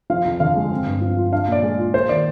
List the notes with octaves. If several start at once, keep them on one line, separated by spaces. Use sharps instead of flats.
F3 F5
F2
D3 F5
G#3
C4
G2
F3
F4
D4 F5
A#2 D5
G#3
F4
A#3 C5
D#3 D5